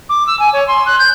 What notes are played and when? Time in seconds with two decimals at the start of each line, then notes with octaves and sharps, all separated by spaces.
0.09 D6
0.27 E6
0.39 G#5
0.53 C#5
0.68 C6
0.86 F#6
0.99 G6